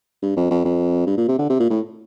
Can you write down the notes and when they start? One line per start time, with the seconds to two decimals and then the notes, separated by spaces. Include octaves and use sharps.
0.22 G2
0.36 F2
0.51 F2
0.65 F2
1.07 G2
1.17 A#2
1.28 C3
1.39 D3
1.50 C3
1.60 A#2
1.70 A2